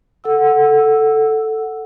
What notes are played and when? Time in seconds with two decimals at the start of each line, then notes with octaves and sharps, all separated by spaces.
0.24 A4 F#5 E6